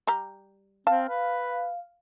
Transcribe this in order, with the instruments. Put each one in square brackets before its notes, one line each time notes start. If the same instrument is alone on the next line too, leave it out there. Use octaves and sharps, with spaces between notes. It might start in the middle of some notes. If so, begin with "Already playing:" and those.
[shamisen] G3 G4 A#5
[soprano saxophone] C4 [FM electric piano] F5 [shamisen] A5
[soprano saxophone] B4